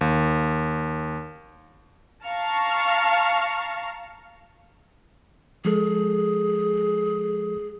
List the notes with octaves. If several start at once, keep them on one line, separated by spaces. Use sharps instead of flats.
D#2
F5 A5 A#5 C#6 F6
F3 G#3 G#4 A4